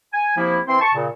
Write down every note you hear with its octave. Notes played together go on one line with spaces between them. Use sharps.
G#5
C3 F3 A#3 E4
E3 C4 C5 C6
A5 C#6
A#2 C#3